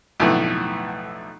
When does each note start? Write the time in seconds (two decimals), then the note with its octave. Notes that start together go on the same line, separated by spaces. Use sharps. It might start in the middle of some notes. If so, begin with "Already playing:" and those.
0.20 B1 F2 A2 D3 A3 B3